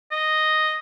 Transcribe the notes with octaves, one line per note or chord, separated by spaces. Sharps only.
D#5